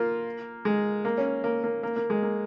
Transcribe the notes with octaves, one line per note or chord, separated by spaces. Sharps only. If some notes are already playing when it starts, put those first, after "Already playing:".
Already playing: A#3 F4
G#3
A#3
C#4
A#3
A#3
A#3
A#3
G#3
A#3